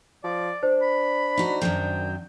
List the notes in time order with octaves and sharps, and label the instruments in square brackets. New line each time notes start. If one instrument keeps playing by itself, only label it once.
[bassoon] F3 [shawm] D5
[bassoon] D4 [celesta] C5
[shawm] B5
[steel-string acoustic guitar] D#4 F#4
[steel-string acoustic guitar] F#2 D#3 F#3 [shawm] G5